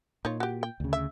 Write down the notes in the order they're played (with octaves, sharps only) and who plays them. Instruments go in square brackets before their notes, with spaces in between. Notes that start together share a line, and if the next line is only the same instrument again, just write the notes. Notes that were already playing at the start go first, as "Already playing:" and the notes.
[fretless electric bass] A#2 [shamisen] D#4 F4 C#5
[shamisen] F#4 G4
G5
[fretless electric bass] D2 C#3
[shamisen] E5